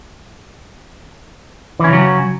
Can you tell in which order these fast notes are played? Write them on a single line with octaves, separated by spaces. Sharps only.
E3 C#4 C#3 F#3